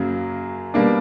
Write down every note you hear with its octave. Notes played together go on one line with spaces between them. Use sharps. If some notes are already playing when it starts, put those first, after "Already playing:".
Already playing: F#2 C#3 F#3 A#3
B2 G3 A#3 D4